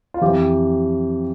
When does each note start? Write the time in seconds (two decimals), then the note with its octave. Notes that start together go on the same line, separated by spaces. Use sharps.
0.14 F4
0.21 F2 E3 G4